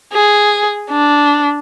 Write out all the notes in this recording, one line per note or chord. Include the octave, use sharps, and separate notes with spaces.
G#4
D4